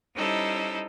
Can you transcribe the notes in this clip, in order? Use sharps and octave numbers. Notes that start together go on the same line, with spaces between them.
G3 C#4 D#4 E4 A4 C5